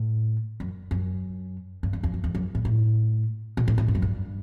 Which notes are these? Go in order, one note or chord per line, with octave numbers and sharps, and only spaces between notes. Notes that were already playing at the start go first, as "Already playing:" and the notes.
Already playing: A2
F#2
F#2
G2
E2
E2
F#2
E2
F#2
A2
A2
B2
A2
A2
G2
F#2
G2